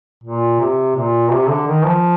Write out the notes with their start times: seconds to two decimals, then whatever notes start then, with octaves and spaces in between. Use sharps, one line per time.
0.24 A#2
0.60 C3
0.96 A#2
1.32 C3
1.49 D3
1.67 D#3
1.85 F3